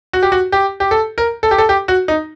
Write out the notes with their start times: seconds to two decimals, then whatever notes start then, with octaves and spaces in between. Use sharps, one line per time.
0.13 F#4
0.23 G4
0.32 F#4
0.52 G4
0.80 G4
0.91 A4
1.18 A#4
1.43 A4
1.51 G4
1.58 A4
1.69 G4
1.88 F#4
2.08 D#4